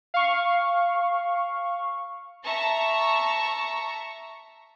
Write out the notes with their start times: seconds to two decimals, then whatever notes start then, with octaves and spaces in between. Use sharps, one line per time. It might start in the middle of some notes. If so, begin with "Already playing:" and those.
0.14 F5 C#6
2.44 E5 A5 A#5 C#6